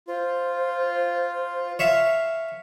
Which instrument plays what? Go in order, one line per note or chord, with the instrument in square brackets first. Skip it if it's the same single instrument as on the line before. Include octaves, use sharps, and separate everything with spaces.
[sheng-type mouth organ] F4 [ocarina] C5
[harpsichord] C#5 E5 F5